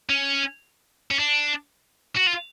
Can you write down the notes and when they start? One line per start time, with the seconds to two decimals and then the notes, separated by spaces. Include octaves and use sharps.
0.10 C#4
1.11 C#4
1.19 D4
2.17 F#4
2.27 F4